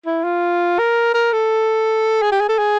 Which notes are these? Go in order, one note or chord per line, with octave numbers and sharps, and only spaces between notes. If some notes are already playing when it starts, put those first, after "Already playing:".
E4
F4
A#4
A#4
A4
G#4
G4
G#4
A4
G#4